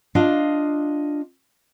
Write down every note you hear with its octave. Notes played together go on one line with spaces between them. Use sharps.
D4 F4 D#5 F5